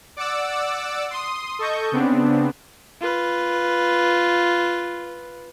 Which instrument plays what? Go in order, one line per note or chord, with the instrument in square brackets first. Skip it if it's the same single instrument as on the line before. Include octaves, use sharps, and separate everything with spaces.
[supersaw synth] D5 F#5 D6 E6
C6 D#6
A4 D#5 C#6 G6
C#3 B3 C4 D4
[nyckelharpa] F4 B4